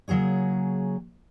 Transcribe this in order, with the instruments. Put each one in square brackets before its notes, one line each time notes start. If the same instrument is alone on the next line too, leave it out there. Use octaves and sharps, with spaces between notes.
[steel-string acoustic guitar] C#3 F#3 A#3 G#4 C#5